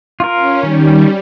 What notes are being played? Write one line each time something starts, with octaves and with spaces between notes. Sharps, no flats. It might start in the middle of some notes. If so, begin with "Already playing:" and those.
F4 A#4
C#4
D#3 G3